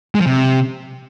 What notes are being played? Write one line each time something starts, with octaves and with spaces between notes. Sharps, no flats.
G#3
F3
C3